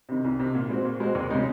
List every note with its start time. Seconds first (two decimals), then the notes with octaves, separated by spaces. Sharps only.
0.09 C3 D#3
0.24 C2
0.39 C3 D#3
0.55 A#2
0.69 G#3 C4 F#4
0.85 A#2
1.00 G#3 C4 F#4
1.15 D#2
1.30 C#3 G#3 D#4